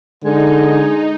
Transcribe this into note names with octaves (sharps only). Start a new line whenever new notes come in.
D3 G#3 D#4